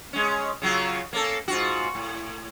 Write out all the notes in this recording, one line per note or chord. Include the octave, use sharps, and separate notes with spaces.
G#3 C#4
C#3 F#3 F4
A#3 C#4 A4
G#2 F4 F#4
A2